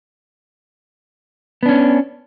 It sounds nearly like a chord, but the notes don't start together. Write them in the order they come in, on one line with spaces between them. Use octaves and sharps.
B3 D4 C#4